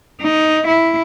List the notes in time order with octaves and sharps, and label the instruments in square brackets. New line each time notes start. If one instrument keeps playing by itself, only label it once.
[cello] D#4
E4